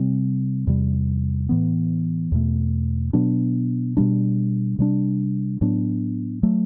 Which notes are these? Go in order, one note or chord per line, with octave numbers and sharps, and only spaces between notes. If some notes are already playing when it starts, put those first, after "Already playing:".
Already playing: C3 G3 C4
E2 C3 G3
A2 E3 B3
E2 B2 A3
B2 F#3 B3 D4
B2 G3 D4
C3 G3 D4
A2 F#3 B3 D4
F#3 A3